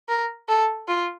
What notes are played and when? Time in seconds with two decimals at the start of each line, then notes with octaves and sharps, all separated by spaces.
0.09 A#4
0.49 A4
0.88 F4